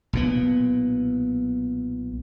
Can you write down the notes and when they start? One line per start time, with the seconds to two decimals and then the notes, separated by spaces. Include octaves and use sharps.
0.13 B1 A#2 B3